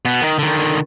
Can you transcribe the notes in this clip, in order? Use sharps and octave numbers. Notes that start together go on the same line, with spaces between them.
B2 B3
D#3
D3 D#3